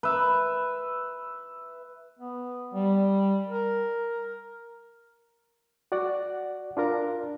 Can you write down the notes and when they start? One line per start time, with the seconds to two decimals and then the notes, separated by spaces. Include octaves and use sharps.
0.03 B4 E5
2.19 B3
2.74 G3
3.47 A#4
5.92 F#4 D5 F#5
6.77 D4 F4 A#4 A#5